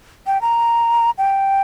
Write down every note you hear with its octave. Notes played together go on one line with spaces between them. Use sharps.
G5
A#5
G5